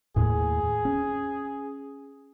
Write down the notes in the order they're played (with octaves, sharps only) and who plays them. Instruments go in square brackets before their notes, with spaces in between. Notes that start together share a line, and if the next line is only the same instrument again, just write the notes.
[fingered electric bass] D#2 A2 [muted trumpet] G#4
[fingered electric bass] C#4